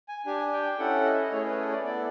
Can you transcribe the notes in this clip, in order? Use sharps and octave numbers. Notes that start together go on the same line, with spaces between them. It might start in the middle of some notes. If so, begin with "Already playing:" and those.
G#5
D4 G4 G#5
G5
C#4 E4 A4 F#5
D#5
E5
D#5
A3 C#4 E4 G#4 C#5
B4
A4
D5
B3 E4 A4 D5